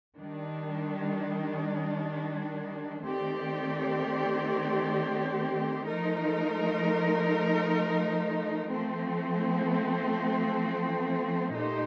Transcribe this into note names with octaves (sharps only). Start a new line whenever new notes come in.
D#3 G3 D4
D#3 A3 C4 G4 D5
F3 A3 D#4 A#4
F3 A3 C4
A#2 A3 D#4 G4 C5